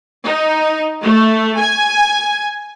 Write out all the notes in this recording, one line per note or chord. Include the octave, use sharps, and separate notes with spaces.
D#4
A3
G#5